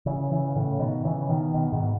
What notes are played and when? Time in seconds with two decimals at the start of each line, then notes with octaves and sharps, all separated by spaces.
0.06 C#3 E3
0.31 C#3 E3
0.56 A2 C#3
0.79 B2 D#3
1.04 C#3 E3
1.29 B2 D#3
1.54 B2 D#3
1.72 G#2 B2